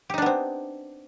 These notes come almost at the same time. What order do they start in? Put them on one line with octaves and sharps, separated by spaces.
G4 D#4 D4 B3 C4